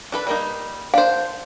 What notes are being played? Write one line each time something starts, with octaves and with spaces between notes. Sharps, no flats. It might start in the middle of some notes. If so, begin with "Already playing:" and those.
D4 A4 B4
G3 A#3 D#4
D4 C5 F5